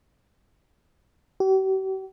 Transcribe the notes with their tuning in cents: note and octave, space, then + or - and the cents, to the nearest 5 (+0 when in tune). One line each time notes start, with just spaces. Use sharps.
G4 -45